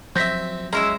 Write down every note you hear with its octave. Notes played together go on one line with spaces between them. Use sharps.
F3 F#3 C4 E5 G6 A#6 B6
G#3 C#4 E4 A#5 E6